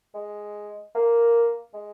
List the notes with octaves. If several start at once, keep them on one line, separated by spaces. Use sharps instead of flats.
G#3
A#3
G#3